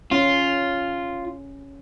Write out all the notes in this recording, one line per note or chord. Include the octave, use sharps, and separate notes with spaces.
C#4 F4